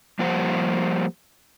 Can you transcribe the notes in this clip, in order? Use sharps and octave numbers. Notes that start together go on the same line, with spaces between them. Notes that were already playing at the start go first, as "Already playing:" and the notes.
F3 G3 A#3 G4 C5 F#5